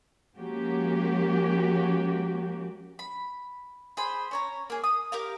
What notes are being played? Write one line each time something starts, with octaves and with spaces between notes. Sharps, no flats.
F3 G#3 A#3 C#4 F#4 G4
B5
G#4 C5 B5
C#4 C#5 A#5
A#3 G#4
D#6
G4 A#4 F5